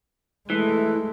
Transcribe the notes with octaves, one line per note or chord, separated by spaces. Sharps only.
E3 G#3 A3